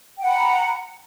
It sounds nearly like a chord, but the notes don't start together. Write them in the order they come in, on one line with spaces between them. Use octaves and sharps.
G5 F#5 B5 A#5